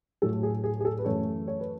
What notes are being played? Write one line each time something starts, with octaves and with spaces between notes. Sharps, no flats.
A2 F#3 A3 A4
G#4
G#4
G#4
A4
B4
F#2 E3 A3 C#5
C#5
B4